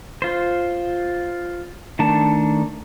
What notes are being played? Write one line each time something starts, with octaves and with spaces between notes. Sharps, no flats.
F4 C5
D#3 A3 D4 A5